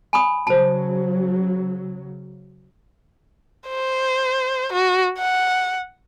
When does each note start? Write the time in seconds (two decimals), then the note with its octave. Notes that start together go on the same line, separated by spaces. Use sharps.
0.13 G#5 B5 D#6
0.47 C#3 F#3 C5 A5
3.68 C5
4.73 F#4
5.18 F#5